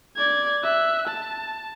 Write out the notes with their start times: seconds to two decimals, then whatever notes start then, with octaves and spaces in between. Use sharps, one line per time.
0.16 D5 G#6
0.63 E5 F#6
1.07 A5